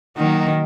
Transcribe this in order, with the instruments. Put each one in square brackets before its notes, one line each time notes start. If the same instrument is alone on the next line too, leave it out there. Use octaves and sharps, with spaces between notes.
[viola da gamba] D#3 [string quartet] F#3 A#3 D#4 F#4